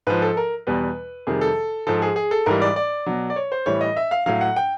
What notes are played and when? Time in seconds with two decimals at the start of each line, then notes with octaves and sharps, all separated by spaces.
0.07 G#2 F3 B4
0.22 A4
0.37 A#4
0.67 E2 B2 G3 B4
1.27 F2 C3 D#3 G3 G#4
1.41 A4
1.87 G#2 F3 A4
2.02 G#4
2.16 G#4
2.31 A4
2.46 G#2 E3 G3 A#4
2.62 D5
2.76 D5
3.06 B2 F#3
3.30 D5
3.36 C#5
3.52 C5
3.66 A2 E3 G3 C#5
3.81 D#5
3.96 E5
4.11 F5
4.26 A2 F#3 F5
4.41 F#5
4.56 G5